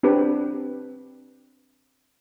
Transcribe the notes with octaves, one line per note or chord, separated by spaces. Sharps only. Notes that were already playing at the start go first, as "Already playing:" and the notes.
C4 D4 G4 B4